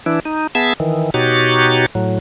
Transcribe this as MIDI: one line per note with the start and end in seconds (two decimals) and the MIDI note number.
0.06 0.20 52
0.06 0.20 62
0.06 0.20 64
0.25 0.47 63
0.55 0.73 59
0.55 0.73 68
0.55 0.73 76
0.55 0.73 81
0.55 0.73 88
0.80 1.10 51
0.80 1.10 52
1.14 1.86 47
1.14 1.86 63
1.14 1.86 66
1.14 1.86 67
1.14 1.86 73
1.14 1.86 93
1.95 2.19 45
1.95 2.19 54